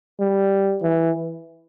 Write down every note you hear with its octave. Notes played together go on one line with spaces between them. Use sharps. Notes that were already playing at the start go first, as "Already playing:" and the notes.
G3
E3